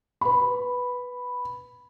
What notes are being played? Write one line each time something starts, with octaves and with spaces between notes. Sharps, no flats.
B4 B5